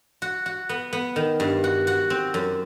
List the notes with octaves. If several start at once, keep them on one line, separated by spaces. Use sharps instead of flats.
F#4
F#4
B3
B3
D#3
G2
F#4
F#4
C4
F#2